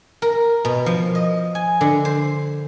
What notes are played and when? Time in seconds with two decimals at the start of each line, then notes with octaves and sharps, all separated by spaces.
0.22 A#4
0.65 B2
0.86 F3
1.15 D#5
1.55 G#5
1.81 D3
2.05 C5